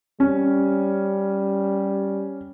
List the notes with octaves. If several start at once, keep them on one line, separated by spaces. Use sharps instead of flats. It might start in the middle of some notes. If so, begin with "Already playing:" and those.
G3 C#4